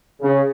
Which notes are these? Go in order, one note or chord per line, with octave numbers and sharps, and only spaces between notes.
C#3